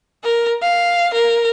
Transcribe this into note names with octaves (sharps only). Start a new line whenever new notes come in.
A#4
F5
A#4